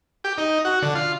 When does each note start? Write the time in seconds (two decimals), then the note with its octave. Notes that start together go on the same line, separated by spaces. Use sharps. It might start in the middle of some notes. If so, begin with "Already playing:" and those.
0.24 G4
0.38 D#4
0.65 F#4
0.82 D3
0.95 F4